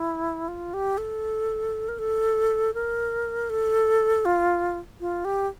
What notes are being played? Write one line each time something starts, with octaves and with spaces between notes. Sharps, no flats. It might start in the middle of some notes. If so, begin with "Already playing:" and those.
Already playing: E4
F4
G4
A4
A#4
A4
A#4
A4
F4
F4
G4